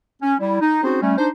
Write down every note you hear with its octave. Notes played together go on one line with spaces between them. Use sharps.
C#4
G3 E4
D#4
C4 C#4 D#4 F#4 G#4 C5
G3 A3 C#4
D4 D#4 C5